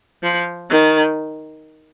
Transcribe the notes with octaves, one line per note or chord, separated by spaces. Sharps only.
F3
D#3